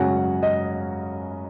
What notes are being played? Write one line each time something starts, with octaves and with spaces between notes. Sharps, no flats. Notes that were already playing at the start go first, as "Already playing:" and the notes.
Already playing: F#2 C#3 G#3 C#4 F#4 F#5 G#5
D#5